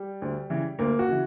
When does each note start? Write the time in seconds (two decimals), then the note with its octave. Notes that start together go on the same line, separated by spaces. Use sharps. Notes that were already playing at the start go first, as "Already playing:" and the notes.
Already playing: G3
0.22 D2
0.50 C#3 E3
0.79 D2 A#3
0.99 F#4
1.09 C#3 E3